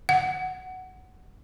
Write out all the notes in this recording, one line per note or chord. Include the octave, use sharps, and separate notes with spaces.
F#5